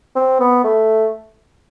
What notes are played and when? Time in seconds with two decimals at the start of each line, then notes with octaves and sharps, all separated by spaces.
0.15 C4
0.40 B3
0.64 A3